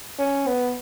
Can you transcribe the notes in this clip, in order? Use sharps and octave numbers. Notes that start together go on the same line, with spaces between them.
C#4
B3